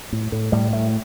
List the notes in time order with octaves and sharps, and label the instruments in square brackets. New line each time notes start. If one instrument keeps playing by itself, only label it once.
[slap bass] A2
A2
A2 G3
A2 A3